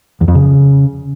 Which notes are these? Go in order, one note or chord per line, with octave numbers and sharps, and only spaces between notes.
E2
F2
C#3